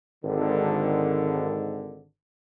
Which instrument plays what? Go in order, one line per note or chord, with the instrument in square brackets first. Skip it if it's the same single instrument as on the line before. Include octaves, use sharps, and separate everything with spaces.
[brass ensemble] G#1 D3